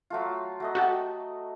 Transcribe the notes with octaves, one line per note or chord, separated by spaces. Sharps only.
F#3 A3 F4
F#3 A3 D#5
F#4 G4 A4